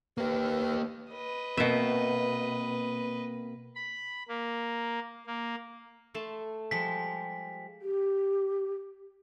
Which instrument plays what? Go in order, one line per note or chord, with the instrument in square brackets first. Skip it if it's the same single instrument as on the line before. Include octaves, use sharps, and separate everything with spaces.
[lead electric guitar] A#3 G4 [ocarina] B4
[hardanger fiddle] B4 D#5
[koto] B2 E5 [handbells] A#3 C4 A#4
[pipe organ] B5
A#3
A#3
[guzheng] A3 A5 C6
[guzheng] F3 G3 G#3 [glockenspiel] B6
[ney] G4